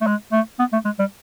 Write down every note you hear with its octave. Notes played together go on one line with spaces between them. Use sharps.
A3
G#3
A3
B3
A3
G#3
G3